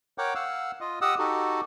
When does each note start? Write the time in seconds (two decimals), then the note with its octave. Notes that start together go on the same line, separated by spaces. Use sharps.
0.18 A#4 C#5 F#5 G5 D6
0.35 F5 F#5 E6
0.81 F4 D#5
1.01 G4 D#5 F#5 D#6 E6
1.19 D#4 F#4 G4 A4